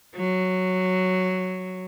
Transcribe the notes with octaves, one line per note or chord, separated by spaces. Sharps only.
F#3